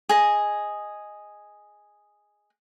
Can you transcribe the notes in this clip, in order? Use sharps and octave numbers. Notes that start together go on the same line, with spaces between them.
G#4 D#5